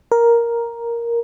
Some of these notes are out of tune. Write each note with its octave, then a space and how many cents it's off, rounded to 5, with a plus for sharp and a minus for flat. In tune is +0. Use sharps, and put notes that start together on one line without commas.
A#4 +5